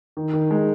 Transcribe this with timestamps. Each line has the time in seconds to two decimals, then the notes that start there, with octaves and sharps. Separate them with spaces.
0.17 D#3
0.33 D#3
0.51 G#3